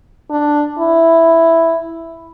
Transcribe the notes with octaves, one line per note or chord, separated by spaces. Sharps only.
D4
E4